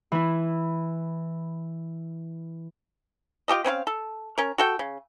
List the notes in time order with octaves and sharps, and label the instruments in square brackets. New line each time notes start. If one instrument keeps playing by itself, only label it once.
[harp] E3 E4
[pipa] F4 G4 A4 D#5
C4 C#4 B4 F5
A4
C#4 A#4
F#4 A4 G5
C#3